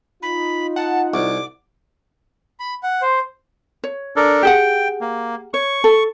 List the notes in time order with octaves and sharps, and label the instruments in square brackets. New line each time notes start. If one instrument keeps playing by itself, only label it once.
[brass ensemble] D#4 F4 [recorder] B5
[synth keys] F#5 [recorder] A5
[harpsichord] C2 [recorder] D6
[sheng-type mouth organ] B5
F#5
C5
[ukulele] C#5
[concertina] D4 A4 A#4
[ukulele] G4 G#4 F#5 [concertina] G5
[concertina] A#3
[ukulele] C#5 [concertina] C#6
[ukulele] A4